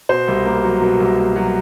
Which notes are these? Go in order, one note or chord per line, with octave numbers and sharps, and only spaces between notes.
B2 C5
C2
A#3
F#3
B2
C2
A#3
F#3